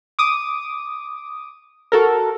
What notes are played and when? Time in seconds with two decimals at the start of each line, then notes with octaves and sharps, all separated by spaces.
0.19 D6 D#6
1.92 F#4 A4 A#4